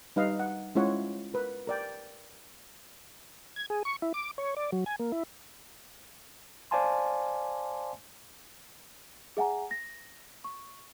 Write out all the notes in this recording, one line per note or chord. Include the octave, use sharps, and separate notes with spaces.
G3 D#4 B4 D#5 F5
F#5
G#3 C#4 E4 F4 C#5 F#5
A#4 B4
A#4 D5 G5
G#6
G#4
C#6
E4
D6
C#5
D5
F#3
G#5
A#3
E4
C5 D5 F5 G#5 A5 C6
G#4 E5 F#5 G#5 A#5
A#6
C#6